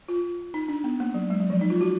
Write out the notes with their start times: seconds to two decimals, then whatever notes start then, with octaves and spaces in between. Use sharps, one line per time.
0.09 F4
0.54 D#4
0.68 D4
0.84 B3
1.00 A#3
1.14 F#3
1.30 G#3
1.40 F#3
1.50 F3
1.61 D#4
1.70 F4
1.81 F#4